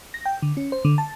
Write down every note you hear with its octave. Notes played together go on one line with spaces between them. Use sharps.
A#6
G5
D3
C#4
C5
D3
A5